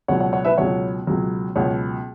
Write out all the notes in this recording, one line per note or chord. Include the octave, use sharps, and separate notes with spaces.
C#2 B2 F#3 C#5 F#5
C#5 F#5
C#5 F#5
B4 E5
C#2 B2 F#3 C#5 F#5
C#2 B2 F#3
C#2 B2 F#3 C#5 F#5